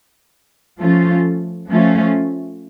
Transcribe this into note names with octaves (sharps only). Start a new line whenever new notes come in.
F3 A3 C#4 F4
F3 A3 C#4 F4